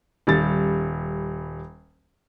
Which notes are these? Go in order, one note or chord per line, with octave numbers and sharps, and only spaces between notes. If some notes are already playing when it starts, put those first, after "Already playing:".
D#1 G3 A6